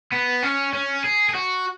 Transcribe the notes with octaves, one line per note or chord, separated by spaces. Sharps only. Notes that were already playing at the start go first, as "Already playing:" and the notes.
B3
C#4
C#4
G#4
G#4
F#4